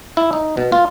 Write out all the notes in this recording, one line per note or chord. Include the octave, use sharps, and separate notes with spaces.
E4
D#4
B2
F4